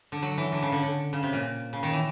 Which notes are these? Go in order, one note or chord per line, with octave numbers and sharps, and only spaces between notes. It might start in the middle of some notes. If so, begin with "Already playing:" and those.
D3
F#3
E3
D3
C#3
D3
D3
C#3
C3
A#2
C#3
D#3
E3